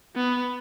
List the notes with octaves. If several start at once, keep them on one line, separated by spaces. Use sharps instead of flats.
B3